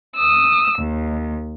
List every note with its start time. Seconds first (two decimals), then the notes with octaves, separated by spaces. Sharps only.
0.16 D#6 E6
0.78 D#2